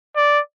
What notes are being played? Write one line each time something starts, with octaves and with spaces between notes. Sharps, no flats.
D5